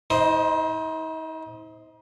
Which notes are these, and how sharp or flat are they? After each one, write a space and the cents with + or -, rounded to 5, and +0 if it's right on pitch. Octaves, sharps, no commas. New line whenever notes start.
D#4 +45 C5 +0 D#5 +0